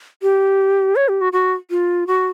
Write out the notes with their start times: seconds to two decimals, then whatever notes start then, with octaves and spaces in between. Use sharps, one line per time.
0.22 G4
0.96 C#5
1.08 G4
1.21 F#4
1.33 F#4
1.70 F4
2.07 F#4